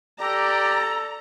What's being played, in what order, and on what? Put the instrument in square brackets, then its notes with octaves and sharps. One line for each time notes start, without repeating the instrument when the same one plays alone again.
[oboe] G4 [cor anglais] A4 [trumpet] D5 [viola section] A#5